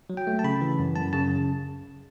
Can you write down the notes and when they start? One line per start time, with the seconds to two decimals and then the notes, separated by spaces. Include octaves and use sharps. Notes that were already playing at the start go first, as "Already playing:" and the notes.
0.10 F#3
0.17 G5
0.27 A3
0.39 A5
0.44 C#3 B5
0.61 E3
0.79 F#2
0.95 F#2 A5
1.13 C#3 A5